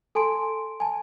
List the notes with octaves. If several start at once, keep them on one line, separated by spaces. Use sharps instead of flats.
A4 G#5 A5 C6 D7
G#5 A5